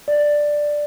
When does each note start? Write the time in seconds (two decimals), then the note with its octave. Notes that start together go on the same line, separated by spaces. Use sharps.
0.08 D5